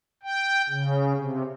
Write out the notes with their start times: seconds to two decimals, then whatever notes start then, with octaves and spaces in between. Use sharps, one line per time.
0.23 G5
0.69 C#3
1.16 C3